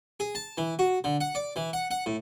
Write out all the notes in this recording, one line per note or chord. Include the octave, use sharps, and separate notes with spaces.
G#4
A5
E3
F#4
D3
F#5
D5
E3
F#5
F#5
A2